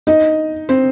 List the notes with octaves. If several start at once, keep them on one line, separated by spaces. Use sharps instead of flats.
D#4 D#5
C4 C5